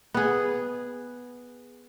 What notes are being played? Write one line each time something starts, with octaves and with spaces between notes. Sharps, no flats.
B3 G#4